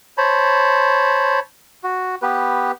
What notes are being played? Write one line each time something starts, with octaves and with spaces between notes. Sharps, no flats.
C5 C#5 A5 B5
F#4
B3 G4 B4